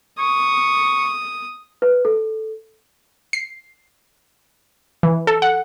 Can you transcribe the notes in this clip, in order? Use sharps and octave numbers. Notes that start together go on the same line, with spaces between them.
C#6 D#6
B4
A4
C7
E3
A4
F#5